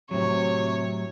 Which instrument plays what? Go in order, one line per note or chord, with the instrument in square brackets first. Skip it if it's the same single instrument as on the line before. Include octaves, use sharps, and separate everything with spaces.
[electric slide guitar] A2 F#3 [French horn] C3 [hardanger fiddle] C#5